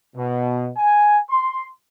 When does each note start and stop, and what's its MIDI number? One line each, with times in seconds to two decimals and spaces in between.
0.15 0.70 47
0.76 1.18 80
1.29 1.68 84